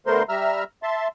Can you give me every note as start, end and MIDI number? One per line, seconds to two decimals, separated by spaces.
0.07 0.23 50
0.07 0.23 57
0.07 0.23 59
0.07 0.23 70
0.07 0.23 72
0.07 0.23 84
0.29 0.64 55
0.29 0.64 76
0.29 0.64 82
0.29 0.64 88
0.29 0.64 89
0.83 1.08 76
0.83 1.08 81
0.83 1.08 84